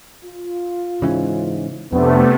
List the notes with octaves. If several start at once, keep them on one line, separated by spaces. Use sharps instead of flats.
F4
G#2 C#3 E3 C#4
F2 C3 A3 B3 D4